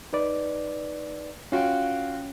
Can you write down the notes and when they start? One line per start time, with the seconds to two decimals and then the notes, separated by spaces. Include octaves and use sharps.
0.13 D#4 B4 D5
1.52 C#4 F4 F#4 G5